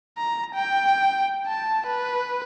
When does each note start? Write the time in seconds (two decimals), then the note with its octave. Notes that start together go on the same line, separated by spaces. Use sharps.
0.18 A#5
0.55 G5
1.47 A5
1.87 B4